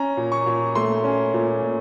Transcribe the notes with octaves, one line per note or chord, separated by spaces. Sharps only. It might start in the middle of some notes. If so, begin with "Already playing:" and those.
Already playing: C#4 A#5
A#2
C#6
A#2
A3 C6
C#4
A#2
A#2